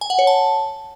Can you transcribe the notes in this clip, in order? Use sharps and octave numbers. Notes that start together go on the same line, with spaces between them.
G#5
F#5
C#5
A5